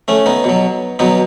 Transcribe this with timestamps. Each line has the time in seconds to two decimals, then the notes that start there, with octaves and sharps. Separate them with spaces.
0.08 A3 C#4
0.26 B3 D#4
0.44 B2 F#3
0.99 B2 F#3 B3 D#4